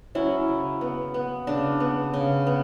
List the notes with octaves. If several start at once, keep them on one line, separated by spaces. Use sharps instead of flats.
F#3 C#4 E4
C#3
B3
B3
C#3 D4
B3
C#3
B3